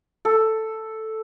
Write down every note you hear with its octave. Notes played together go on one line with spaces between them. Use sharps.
A4